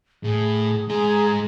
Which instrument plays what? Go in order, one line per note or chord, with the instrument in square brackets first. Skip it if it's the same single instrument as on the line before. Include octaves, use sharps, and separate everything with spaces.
[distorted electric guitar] A2 [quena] G#4
[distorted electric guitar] G#2 A#5 [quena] G#4